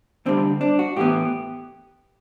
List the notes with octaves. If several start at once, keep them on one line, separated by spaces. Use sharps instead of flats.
D2 D3 G3 C4
D4
F#4
A2 E3 B3 G4